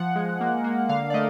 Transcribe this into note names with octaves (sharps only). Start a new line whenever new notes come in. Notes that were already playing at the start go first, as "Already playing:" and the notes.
Already playing: F3 F#5
G#3
A#3
A#3
D3 F5
D5
A3 D#5